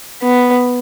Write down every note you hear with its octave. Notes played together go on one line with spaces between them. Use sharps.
B3